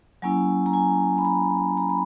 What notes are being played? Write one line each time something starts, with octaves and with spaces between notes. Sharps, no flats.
F#3 A#3 C#4 E4 G#5
A#5
G#5
B5
A#5
A#5
B5